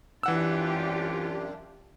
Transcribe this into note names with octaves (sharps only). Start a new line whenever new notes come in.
F#2 C3 E3 D4 F4 G4 F#5 E6